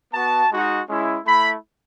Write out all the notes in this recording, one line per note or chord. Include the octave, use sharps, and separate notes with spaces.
B3 F#4 A5
G#3 D#4 F#4
G#3 C#4 E4
A3 E4 B5